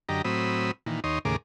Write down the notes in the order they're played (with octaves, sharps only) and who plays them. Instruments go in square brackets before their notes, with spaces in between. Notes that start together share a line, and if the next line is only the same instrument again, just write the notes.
[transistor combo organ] F#2 D3 G4 D#5 A#5
A2 F#3 C4 B5 D#6 E6
A#2 D#3 E3
D#2 D#4 C#5 C6 D#6
D#2 A2 C#3 G#4 A#4 D6